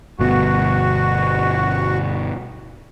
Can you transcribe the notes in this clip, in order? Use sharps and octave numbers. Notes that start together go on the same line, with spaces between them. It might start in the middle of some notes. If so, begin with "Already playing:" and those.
G1 B2 F#4